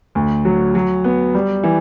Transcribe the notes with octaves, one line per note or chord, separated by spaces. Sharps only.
D2
F#3
F#3
B3
G3
E3